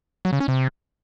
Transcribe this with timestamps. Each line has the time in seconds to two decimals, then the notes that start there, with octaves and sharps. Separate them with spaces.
0.25 F#3
0.33 C#3
0.40 C#4
0.48 C3